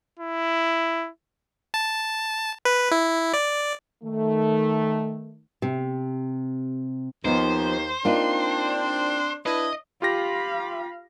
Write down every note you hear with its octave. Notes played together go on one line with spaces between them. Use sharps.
E4
A5
B4
E4
D5
D#3 A3
C3
D#2 F3 B3 D#4 C5
A#3 C4 D4 D#4 F4
D4 E4 B4 D#5
F4 G4 F5 B5 A#6